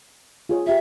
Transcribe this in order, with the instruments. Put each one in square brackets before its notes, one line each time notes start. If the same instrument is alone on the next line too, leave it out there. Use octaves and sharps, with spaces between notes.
[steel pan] F4 G#4 C#5
[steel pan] F4 G4 [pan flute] E5